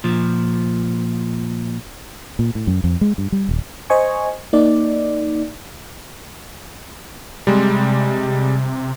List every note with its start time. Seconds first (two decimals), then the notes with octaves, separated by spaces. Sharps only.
0.04 A#2 F3
2.39 A#2
2.55 A2
2.67 F#2
2.84 F2
3.01 G#3
3.18 G2
3.32 G3
3.49 D#1
3.90 C5 D#5 G#5 C#6
4.53 A#3 D#4 D5
7.47 C3 G3 G#3